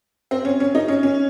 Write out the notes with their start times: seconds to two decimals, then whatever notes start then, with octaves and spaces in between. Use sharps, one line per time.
0.31 C4
0.45 C#4
0.60 C#4
0.75 D#4
0.88 C#4
1.03 C#4